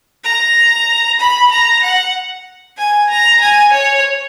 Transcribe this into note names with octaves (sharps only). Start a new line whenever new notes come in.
A#5
B5
A#5
F#5
G#5
A#5
G#5
C#5